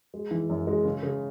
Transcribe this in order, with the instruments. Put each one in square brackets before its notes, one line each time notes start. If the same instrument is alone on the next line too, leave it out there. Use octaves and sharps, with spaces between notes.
[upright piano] G#3
E3
F#2
G#3
C#3
C#3